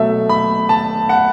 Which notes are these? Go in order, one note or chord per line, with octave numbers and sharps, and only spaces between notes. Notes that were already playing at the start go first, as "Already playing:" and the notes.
Already playing: B2 F#3 A3 E5
B5
A5
F#5